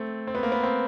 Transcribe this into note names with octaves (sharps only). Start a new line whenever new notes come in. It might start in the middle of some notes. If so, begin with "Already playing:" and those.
Already playing: A3 C4
C4
B3
A#3
B3
C4